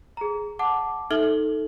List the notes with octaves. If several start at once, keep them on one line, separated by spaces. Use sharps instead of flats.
G#4 A#5
F#5 A5 D6
D#4 A4 E5 F6 F#7 G7